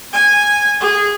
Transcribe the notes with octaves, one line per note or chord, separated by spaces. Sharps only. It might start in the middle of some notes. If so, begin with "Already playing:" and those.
G#5
G#4